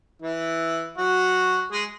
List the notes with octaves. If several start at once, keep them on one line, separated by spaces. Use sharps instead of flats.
E3 E4
F#3 F#4
G#3 G#4